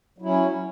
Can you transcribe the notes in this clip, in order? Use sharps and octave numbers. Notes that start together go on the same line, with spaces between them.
F#3 C#4 E4